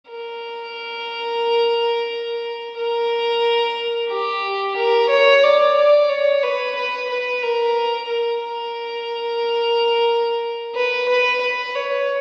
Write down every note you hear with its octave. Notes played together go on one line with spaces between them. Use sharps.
A#4
A#4
G4
A#4
C#5
D5
D5
C#5
B4
B4
B4
A#4
A#4
B4
B4
B4
C#5